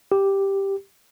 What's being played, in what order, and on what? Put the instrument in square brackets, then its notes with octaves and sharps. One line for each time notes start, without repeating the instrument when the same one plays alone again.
[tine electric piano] G4